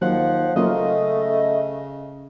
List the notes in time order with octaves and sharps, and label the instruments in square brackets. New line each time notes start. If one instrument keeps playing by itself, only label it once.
[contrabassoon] D#2 [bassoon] F3 [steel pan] F#3 [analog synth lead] F#5
[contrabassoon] C#3 [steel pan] F#3 A#3 F4 [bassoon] A3 [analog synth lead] D#5